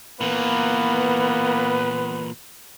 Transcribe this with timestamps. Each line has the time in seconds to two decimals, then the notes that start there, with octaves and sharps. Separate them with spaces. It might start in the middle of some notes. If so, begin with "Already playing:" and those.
0.21 A#2 E3 A#3 B3 B4